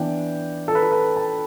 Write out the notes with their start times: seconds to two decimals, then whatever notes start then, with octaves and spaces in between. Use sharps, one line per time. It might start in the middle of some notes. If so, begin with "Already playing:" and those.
Already playing: E3 B3 D4 G5
0.68 A4
0.75 B4
0.83 A4
0.92 B4
1.16 A5